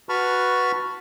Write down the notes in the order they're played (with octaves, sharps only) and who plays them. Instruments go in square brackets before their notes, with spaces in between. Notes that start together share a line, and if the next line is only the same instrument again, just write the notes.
[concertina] F#4 B4 A5 B5 C#6 F6